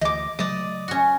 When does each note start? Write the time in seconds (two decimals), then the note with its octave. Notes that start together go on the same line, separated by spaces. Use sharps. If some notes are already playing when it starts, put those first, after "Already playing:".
0.01 D2 E3 D#5 D6
0.39 C#3 F#3 A3 D5 D#5
0.88 C#4 F#4